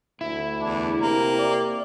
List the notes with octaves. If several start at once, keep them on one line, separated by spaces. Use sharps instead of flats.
D2 E4
E2 D4
C3 A#3 A#5
D5